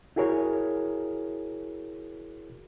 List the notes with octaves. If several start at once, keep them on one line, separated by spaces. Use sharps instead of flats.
E4 F#4 G#4 A#4 C#5